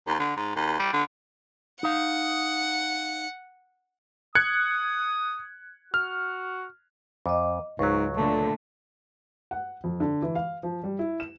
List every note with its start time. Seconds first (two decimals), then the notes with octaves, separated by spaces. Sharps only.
0.07 D#2
0.19 D3
0.37 G#2
0.56 D#2
0.79 G3
0.93 D3
1.83 D#4 F5 F#5
4.35 D#6 F#6 G#6 C#7
5.94 F#4 F6
7.26 F2 D#5 D6
7.79 C#2 G#2 F#3 C#6
8.16 A#2 D3 A3
9.51 F#5
9.84 F2
10.00 D3
10.22 E3
10.35 F5
10.63 F3
10.84 G3
10.99 E4
11.20 E7